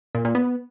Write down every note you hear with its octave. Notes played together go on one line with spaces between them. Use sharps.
A#2
A#2
B3